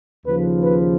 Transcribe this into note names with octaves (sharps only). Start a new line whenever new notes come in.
D#2 C#3 F3 B4
B4